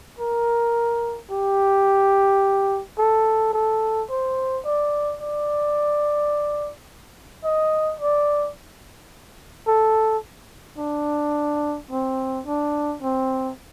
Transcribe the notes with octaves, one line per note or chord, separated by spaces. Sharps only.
A#4
G4
A4
A4
C5
D5
D5
D#5
D5
A4
D4
C4
D4
C4